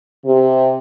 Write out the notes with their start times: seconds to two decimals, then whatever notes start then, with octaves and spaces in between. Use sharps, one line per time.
0.25 C3